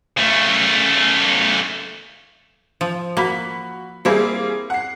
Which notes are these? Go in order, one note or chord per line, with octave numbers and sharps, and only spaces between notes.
C#3 A3
F3
A#3 F#4 B5 B6
G3 A#3 C4 E4 G#4
F#5 C7